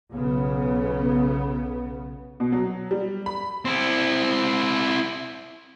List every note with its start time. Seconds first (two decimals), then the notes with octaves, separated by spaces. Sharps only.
0.11 B1 C#3 B3
2.40 B2
2.52 F#3
2.91 G3
3.26 B5
3.65 C4 E4